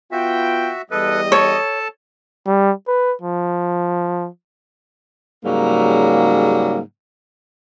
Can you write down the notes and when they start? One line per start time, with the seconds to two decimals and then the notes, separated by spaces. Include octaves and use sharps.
0.12 B3 F4 F#4 E5 G5
0.91 E2 G3 A4 B4 D#5
1.32 A4 C#5 A5
2.47 G3
2.87 B4
3.22 F3
5.45 G#2 C#3 F#3 G3 A#3